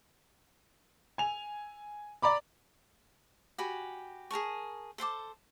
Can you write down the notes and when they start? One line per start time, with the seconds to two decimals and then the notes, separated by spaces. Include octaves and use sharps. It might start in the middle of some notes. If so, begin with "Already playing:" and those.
1.18 G#5 F7
2.22 D5 A#5 B5 D6
3.58 F#4 G4 G#5 B5
4.31 G#4 A#4 A5 C#6
4.98 A4 C5 A5 D6